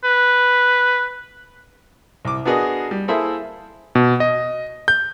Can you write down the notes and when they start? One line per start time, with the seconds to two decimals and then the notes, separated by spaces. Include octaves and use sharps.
0.04 B4
2.25 C2 D6
2.45 B3 D4 F#4 G#4 A#4 D#5
2.91 G3
3.08 A#3 E4 G#4 A4 C5 E5
3.95 B2
4.20 D#5
4.88 G6